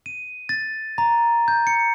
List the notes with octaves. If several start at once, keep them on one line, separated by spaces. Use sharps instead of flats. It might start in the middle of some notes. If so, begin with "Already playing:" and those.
D#7
A6
A#5
G6
C#7